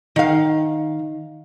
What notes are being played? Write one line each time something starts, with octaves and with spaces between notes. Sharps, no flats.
D#3 F5